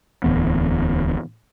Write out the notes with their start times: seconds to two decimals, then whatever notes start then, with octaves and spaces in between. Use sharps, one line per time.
0.24 D1 E2 B3